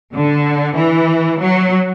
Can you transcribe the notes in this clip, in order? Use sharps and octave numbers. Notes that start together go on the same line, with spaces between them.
D3
E3
F#3